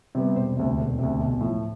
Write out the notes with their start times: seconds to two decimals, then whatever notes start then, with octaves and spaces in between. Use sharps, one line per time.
0.15 C3 G3 B3
0.36 E1 C5
0.57 D2 C3
0.78 E1
0.99 D2 C3
1.20 B1
1.41 A2 F3